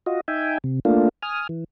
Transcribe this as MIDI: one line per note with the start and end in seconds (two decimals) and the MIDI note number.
0.06 0.21 65
0.06 0.21 66
0.06 0.21 75
0.28 0.58 63
0.28 0.58 76
0.28 0.58 79
0.28 0.58 80
0.64 0.80 48
0.85 1.09 57
0.85 1.09 58
0.85 1.09 62
0.85 1.09 65
1.22 1.47 80
1.22 1.47 87
1.22 1.47 89
1.49 1.64 52